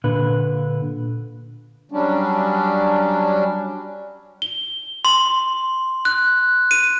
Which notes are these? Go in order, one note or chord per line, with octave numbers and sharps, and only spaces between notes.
A#2 D3 B4
F#3 G3 C#4 D4
G7
C6
F#6
D#7